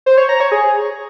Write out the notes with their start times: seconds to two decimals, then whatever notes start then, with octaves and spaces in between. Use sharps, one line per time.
0.06 C5
0.18 C#5
0.29 A#5
0.40 C#5
0.52 G#4